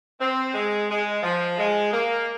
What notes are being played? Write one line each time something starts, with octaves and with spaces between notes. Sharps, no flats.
C4
G#3
G#3
F3
G#3
A#3